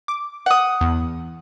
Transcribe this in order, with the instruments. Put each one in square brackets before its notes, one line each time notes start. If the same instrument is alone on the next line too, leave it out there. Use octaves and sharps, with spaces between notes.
[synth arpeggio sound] D6
[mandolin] F#5 D#6
[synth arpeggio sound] E2